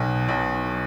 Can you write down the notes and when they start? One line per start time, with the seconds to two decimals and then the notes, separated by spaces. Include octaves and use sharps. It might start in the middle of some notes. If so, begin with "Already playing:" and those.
Already playing: B1 B2
0.29 B1